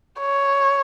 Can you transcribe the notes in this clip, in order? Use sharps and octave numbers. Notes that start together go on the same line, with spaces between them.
C#5